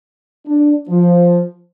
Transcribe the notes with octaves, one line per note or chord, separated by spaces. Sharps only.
D4
F3